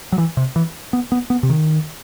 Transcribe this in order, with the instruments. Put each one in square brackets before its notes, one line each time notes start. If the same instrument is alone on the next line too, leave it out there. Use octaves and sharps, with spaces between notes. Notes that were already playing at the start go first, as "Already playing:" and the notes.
[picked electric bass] F#3
E3
C3
E3
B3
B3
B3
C3
D#3